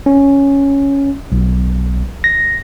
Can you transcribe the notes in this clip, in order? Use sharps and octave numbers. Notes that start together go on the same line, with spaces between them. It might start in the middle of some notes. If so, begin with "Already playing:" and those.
C#4
B1
A#6